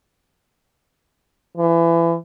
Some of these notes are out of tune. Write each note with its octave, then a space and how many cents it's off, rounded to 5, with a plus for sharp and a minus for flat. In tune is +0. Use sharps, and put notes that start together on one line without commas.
E3 +30